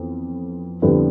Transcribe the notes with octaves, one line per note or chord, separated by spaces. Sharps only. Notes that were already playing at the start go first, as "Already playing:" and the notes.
Already playing: F2 E3 B3
F2 D3 G3 B3 E4